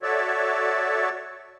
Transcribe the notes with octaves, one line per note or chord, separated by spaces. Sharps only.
F#4 A4 C#5 D5 E5